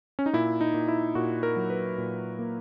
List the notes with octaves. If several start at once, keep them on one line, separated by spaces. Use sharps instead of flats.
C#4
D#4
A#2 E4
D#4
A#2
E4
A#2 F#4
A#4
F#3
B4
A#2
A#3